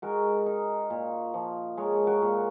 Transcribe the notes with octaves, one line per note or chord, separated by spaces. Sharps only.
G#3 F#4 A#4
D#4
A#2
F3
G#3 A#4 C#5
F#4 A#4
A#2